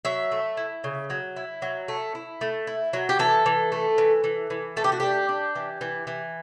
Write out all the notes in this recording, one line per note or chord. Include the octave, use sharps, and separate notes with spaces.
F#3 E5
A3
E4
C#3
F#3
E4
F#3
A3
E4
A3
E4
F#3
G4
E3 A4
E3
A3
E3
E3
E3
A3 A4
G4
F#4
D4 G4
D4
E3
E3
E3